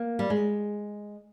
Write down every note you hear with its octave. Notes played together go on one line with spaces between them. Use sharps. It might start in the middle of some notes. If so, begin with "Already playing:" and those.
Already playing: A#3
G3
G#3